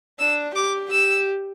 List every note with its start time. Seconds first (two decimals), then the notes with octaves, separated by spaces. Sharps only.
0.19 D4 E6
0.55 G4 D6
0.91 G4 E6